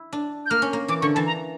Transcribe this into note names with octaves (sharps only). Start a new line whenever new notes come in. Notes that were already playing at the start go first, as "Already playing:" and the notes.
Already playing: E4
D4
G6
A#3 F6
C#4
A#3
E3 D6
D3 C#6
E3 A5
A#5